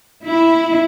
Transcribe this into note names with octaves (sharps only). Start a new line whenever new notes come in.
E4